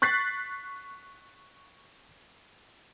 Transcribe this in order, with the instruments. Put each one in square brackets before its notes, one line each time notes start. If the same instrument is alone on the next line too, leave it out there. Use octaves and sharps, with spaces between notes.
[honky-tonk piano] C#6 F#6 A6 B6 C7